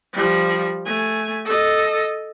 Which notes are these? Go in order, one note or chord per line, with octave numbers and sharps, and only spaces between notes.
F3 G3
A3 G#5
A4 D#5